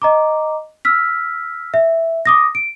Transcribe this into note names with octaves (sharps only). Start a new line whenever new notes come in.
D#5 A#5 D6
E6 F6 B6
E5
D6 D#6 A#6
D7